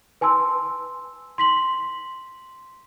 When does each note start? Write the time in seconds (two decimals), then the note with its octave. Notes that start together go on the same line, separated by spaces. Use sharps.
0.21 B4 G#5 A5 C6 E6
1.38 C6 B6 F#7